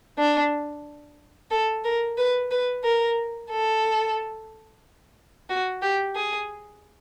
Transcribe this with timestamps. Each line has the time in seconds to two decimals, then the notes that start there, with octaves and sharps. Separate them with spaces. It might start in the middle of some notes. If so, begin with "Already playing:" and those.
0.19 D4
1.51 A4
1.84 A#4
2.18 B4
2.51 B4
2.84 A#4
3.51 A4
5.49 F#4
5.82 G4
6.15 G#4